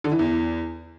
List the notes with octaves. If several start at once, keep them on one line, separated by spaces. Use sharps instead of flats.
D3
E3
E2